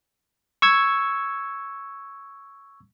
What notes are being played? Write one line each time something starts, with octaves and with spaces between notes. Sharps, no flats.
C#6 E6 G#6